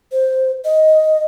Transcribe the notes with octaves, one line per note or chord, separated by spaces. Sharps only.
C5
D#5